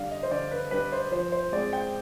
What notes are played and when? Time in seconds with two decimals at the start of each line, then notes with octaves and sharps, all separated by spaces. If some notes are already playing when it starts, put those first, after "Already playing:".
Already playing: D3 G3 D4 F5
0.11 D#5
0.23 C5
0.31 D3 D5
0.51 B4
0.71 G3 D4 B4
0.92 C5
1.12 F3 C5
1.32 C5
1.52 G#3 C4 D5
1.73 G5